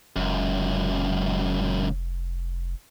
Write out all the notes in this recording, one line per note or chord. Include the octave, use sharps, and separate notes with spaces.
F1 C#2 F#2